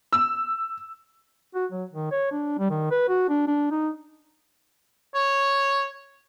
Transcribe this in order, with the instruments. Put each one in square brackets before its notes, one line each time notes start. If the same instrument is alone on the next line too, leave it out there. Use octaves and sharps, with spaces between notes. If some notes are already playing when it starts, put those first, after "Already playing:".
[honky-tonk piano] E6
[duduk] F#4
F#3
D#3
C#5
D4
G3
D#3
B4
F#4
D4
D4
D#4
[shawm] C#5